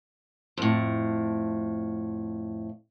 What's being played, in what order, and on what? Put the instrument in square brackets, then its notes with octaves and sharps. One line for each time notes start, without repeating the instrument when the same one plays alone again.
[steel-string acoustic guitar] F2 A2